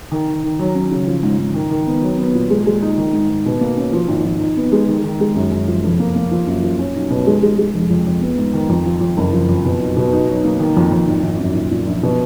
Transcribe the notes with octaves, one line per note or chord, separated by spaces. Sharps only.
D#3
D#3
D#3
F#3
C#4
C#3
F3
G#2
G#2
D#3
D#3
B3
F#3
B3
A#2
G#3
G#3
D#4
D#3
G#2
G#2
B2
A#3
C#4
F3
G#1
F3
D#4
B3
G#3
D#3
D#3
G#3
F#2
F#2
F3
F1
A#3
A#3
F3
F#2
F3
C#4
B1
B2
G#3
G#3
G#3
F1
F2
F2
B3
G#2
D#3
F2
F3
F2
F#1
F3
F2
B2
B1
B2
D#4
F#3
A#3
D#3
F2
F2
G#1
G#1
F#2
A#2
A#2
A#1
B2